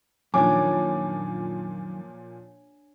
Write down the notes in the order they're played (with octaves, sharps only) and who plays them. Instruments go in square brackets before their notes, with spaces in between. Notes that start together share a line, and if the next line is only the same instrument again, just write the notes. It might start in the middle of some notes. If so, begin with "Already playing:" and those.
[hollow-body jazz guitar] F#2 D#3 [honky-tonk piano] A#2 F3 D6 [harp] D4 C#5 [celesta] G#5